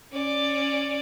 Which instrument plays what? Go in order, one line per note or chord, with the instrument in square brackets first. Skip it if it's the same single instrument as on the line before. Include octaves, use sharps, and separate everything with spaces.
[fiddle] C#4 D5